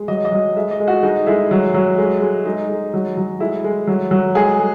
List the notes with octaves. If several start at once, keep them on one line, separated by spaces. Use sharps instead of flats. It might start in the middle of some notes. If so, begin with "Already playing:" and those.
Already playing: G#3
F#3 D#5
D#5
F#3
G#3 E5
D#5
G#3
F#4
G#3 D#4
G#3 E4
F#3
F#3
G#3
G#3
G#3 D#4
G#3
F#3
F#3
G#3 E4
G#3
F#3
F#3
G#3 G#4
G#3